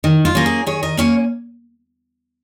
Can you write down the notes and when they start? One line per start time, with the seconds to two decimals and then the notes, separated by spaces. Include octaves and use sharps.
0.04 D#3
0.25 F4
0.35 A#3 C#4
0.46 G#4
0.66 D#3 G#4 C#5
0.83 A#4 D#5
0.97 A#3 C#4 C#5 F5